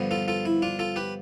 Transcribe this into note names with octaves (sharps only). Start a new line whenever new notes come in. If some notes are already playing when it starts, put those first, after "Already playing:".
Already playing: G2 D3 F3 B3
F4 A4
F4 A4
E4
D4 F4
F4 A4
G4 B4